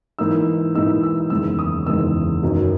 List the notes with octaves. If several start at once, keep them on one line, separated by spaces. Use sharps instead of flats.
G#2 E3 A#3 D#4 E6
G#2 E3 A#3 D#4 E6
E6
F#1 E2 D#3 G#3 E6
D#6
F#1 E2 D#3 G#3 E6
F#1 F#2 D#3 F#3 C#4